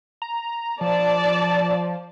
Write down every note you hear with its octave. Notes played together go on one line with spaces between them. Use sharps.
A#5
F3 D5 A5